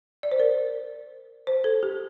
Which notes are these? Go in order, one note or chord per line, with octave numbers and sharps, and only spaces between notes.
D5
C5
A#4
C5
A4
G4